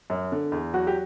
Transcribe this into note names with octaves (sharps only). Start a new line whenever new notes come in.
F#2
D3
E2
F#3 F#4
G4